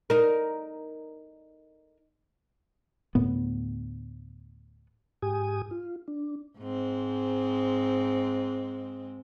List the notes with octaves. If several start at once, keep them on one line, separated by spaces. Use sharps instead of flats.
D#4 A#4
D2 A2 B3
G#2 G4 G#5 D#6
F4
D4
G#2 G#3 C4